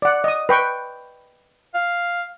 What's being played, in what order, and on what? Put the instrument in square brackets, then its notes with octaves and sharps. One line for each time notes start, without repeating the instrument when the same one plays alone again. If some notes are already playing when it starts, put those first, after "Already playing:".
[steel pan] D5 F#5
D#5 D#6
B4 G5 C#6
[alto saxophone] F5